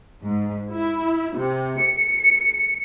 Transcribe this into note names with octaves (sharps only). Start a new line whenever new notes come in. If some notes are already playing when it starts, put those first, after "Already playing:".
G#2
E4
C3
C#7